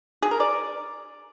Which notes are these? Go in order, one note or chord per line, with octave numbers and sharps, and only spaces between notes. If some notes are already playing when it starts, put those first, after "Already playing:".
G#4
A#4
D5